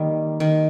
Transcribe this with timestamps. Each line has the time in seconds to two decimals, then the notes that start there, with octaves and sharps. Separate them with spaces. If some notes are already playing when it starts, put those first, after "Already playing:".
Already playing: D#3 G3 A#3
0.40 D#3